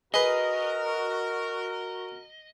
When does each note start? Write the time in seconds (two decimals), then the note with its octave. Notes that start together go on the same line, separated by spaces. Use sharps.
0.14 F#4 G#4 A#4 B4 D#5